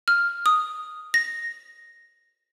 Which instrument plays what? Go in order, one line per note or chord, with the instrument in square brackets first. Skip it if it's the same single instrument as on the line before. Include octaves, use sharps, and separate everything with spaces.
[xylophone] F6
D#6
A#6